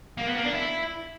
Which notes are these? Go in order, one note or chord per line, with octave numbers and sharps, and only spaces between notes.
A#3
B3
A#3
D4
E4